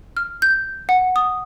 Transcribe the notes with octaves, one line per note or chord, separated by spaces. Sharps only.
F6
G6
F#5
D#6